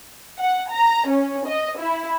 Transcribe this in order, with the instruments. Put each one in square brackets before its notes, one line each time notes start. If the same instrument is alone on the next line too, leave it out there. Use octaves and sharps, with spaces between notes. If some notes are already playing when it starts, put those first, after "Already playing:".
[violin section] F#5
A#5
C#4
D#5
E4